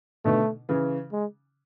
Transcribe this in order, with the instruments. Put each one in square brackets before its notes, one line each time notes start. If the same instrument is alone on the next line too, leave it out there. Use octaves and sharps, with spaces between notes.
[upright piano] B2 D3 [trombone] A3
[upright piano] C#3 E3
[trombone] G#3